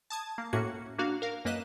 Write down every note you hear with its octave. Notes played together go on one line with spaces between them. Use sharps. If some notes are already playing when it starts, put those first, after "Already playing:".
A5 D#6 G#6
A#3
A2 A#3 C#4 F#4 C#7
A#3 D4 F#4 F5
A#4 F5
F#2 A#3 B4 D#5 F#6 E7